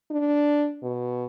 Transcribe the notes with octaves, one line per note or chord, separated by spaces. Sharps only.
D4
B2